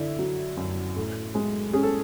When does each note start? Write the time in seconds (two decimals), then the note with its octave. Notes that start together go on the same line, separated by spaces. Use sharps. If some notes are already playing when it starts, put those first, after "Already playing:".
Already playing: D3 E4 D5 E5
0.19 F#3
0.57 F#2
0.96 A2
1.35 G#3
1.73 C#4 G#4
1.83 A4